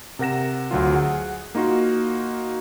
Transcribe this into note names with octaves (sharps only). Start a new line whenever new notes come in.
C3 A#4 F#5 A#6 E7
D2 F#3 F4
G#4 F#5
A#3 D#4 F4 F#4